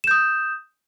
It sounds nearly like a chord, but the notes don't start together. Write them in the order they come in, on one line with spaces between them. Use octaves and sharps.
E7 G6 D#6